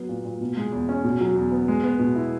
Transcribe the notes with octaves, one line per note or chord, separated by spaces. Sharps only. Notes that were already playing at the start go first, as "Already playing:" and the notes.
Already playing: F#3 B3
A#2
A#2
B2
G#3
E2
C#4
B2
F#3
E2
B3
G#3
B3
B2
E4